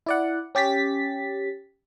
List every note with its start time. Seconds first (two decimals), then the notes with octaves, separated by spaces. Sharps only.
0.06 E4 D5 F#5
0.55 C#4 G4 A6 B6